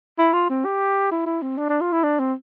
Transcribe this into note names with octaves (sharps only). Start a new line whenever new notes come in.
E4
F4
C4
G4
E4
E4
C4
D4
D4
F4
E4
D4
C4